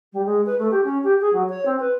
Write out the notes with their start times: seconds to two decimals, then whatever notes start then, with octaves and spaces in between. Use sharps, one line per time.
0.13 G3
0.25 G#3
0.46 B4
0.58 A3
0.71 G4
0.84 C#4
1.04 G4
1.20 G#4
1.33 F#3
1.49 C#5
1.65 C4
1.80 B4